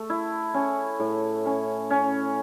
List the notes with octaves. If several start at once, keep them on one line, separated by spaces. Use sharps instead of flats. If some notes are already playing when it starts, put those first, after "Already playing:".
Already playing: A3
E4
C#4
A2
C#4
C#4